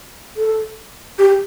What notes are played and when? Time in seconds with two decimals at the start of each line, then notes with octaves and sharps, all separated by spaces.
0.36 A4
1.18 G4